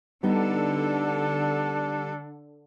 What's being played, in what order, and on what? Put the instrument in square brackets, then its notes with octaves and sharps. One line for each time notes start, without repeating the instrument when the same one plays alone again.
[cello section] D3 A4 [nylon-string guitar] G3 B3 D#4 [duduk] D4